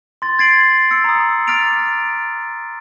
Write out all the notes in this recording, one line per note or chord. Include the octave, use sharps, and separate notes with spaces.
C6 A6
G#6 A6 C7 D7 F#7
E6 C#7
A#5 D#6
D6 F6 A6 B6 D7 F7